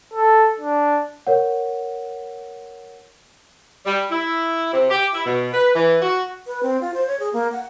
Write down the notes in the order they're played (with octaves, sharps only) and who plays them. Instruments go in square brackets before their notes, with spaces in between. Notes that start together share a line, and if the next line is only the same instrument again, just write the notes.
[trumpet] A4
D4
[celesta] A#4 C#5 F#5
[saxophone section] G3
E4
C3
G4
E4
B2
B4
E3
F#4
[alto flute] B4
C4
F4
C5
C#5
G#4
A#3
F#5